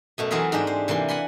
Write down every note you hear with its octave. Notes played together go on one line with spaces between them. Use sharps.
F#2 B2 A3
E3 F#3 C4 G#4 A#4 E5
G#2 G#3 D4 G4
C5
C3 E3 A#3 C6
F#5 G#5 B5 C6